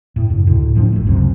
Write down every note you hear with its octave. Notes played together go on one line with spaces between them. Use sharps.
A2
F#2 A2 C#3
D2 A2
A2 F3 B3 D4
G1 A3
C#2 F#2 C3